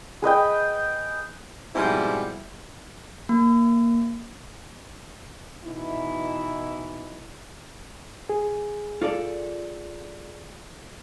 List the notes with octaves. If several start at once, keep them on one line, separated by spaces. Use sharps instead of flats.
G#4 B4 D#5 G5
G#2 B2 F3 G3 C4 E4
A#3
B2 E3 D#4 E4
G#4
F4 A4 D5